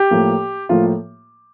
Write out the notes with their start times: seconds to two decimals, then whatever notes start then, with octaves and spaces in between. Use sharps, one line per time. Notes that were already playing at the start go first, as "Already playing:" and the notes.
Already playing: G4
0.11 A2 F3 A#3
0.69 A2 F3 A#3 F4